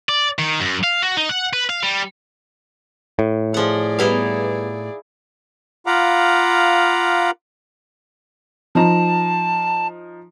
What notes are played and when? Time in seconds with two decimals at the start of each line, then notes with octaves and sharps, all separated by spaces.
0.09 D5
0.39 D#3
0.60 F#2
0.84 F5
1.02 F#4
1.17 D#4
1.29 F#5
1.53 B4
1.70 F5
1.83 G3
3.19 A2
3.54 F3 G#4 D5 F#5
3.99 G3 B3 D#4 E4 G4 F5
5.87 F4 F5 F#5 A#5 B5 D6
8.75 F3 D#4 A5 A#5